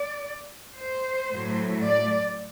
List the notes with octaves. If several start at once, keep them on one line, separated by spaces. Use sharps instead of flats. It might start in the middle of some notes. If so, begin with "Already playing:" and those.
Already playing: D5
C5
A2 F#3 A3
D5